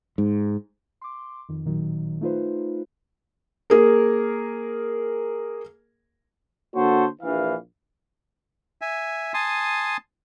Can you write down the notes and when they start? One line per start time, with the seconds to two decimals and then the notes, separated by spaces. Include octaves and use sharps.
0.18 G#2
1.01 C6 D6
1.49 F2 D#3
1.64 A1 A#2 D#3 F#3
2.21 A3 D#4 F4 B4 C5
3.70 A#3 G#4 A#4
6.74 D3 A#3 F#4 A4 C5 C#5
7.22 A#1 E3 F5
8.81 E5 G#5
9.34 G#5 A5 C6 D#6